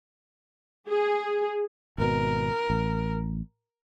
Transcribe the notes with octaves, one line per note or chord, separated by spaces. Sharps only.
G#4
G#1 B2 A#4
A1